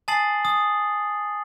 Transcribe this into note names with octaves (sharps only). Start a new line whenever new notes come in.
G#5 A5 D#6 A6 C7 F#7
D#6